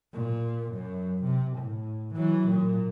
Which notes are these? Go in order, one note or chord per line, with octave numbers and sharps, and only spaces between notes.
A#2
F#2
C3
A2
E3 F#3
A#2